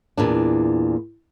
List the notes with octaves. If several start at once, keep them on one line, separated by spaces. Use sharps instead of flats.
E2 A#2 D4